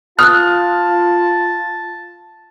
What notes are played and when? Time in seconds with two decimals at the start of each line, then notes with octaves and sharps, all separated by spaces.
0.19 F4 A5 D#6 F6 F#6